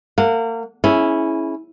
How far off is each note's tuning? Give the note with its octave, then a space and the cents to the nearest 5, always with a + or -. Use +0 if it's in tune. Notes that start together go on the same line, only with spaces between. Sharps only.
A#3 -35 F#5 -35
C#4 +0 E4 -10 G#4 +25